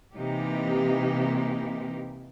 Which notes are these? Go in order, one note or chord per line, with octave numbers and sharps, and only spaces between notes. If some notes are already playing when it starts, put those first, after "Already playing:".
C3 E3 A#3 D#4 G4